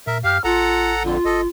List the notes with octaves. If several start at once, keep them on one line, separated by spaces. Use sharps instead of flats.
A#2 A#4 E5
F#2 G4 F5 F6
A1 F4 A4 F#5 A#5
F2 D3 F4
G1 A4 D#5